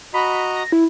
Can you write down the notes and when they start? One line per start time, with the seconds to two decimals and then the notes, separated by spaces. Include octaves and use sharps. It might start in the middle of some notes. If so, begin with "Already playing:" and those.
0.14 F#4 D#5 A#5 B5
0.57 A#6
0.72 E4